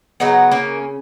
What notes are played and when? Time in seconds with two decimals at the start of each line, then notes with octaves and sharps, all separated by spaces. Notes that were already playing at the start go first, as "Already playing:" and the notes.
0.20 C#3 F#3 B3 D#4
0.52 A#3 C#4